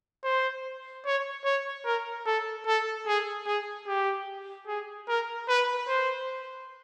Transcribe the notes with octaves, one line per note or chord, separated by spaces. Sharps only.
C5
C#5
C#5
A#4
A4
A4
G#4
G#4
G4
G#4
A#4
B4
C5